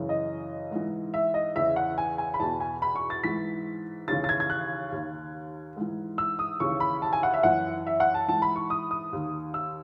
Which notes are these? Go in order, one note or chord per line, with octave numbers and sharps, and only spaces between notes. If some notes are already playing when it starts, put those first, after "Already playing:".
Already playing: F#2 C#3 E3
D#5
G#2 E3
E5
D#5
E2 C#3 E3 E5
F#5
G#5
G#5
B5
E2 B2 A5
G#5
B5
C#6
A6
G#2 E3 B6
D#2 C#3 E3 A6
A6
G#6
G#6
F#6
D#2 D#3
G#2 E3
E6
D#6
D#2 C#3 E3 C#6
B5
A5
G#5
F#5
E5
F#2 E3 F#5
E5
F#5
A5
G#2 E3 A5
B5
C#6
D#6
D#6
D#2 D#3
E6